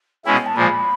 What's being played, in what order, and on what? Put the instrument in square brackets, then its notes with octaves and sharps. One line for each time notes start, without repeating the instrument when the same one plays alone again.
[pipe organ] B2 G#3 C#4 E4 [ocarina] G5
[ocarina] G5
A5
[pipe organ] A#2 F3 G#3 [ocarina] B5